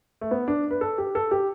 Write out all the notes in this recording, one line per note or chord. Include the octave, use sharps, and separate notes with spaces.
A3
B3
D4
B4
A4
G4
A4
G4